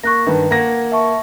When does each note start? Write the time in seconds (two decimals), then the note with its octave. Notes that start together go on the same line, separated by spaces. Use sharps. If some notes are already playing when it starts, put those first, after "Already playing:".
0.03 A#3 C#6 F#6 A#6
0.27 G2 D#3 B4
0.51 A#3 F#5 G#6 A#6
0.92 E5 A5 C#6